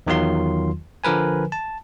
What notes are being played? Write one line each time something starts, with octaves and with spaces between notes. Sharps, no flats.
E2 D#3 F#3 F4 C6
D3 F3 A#4 B4 G#5
A5